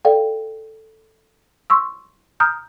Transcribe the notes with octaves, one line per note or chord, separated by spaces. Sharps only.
A4 D5 F5 G5
C6 C#6 E6
A#5 D#6 F6 G6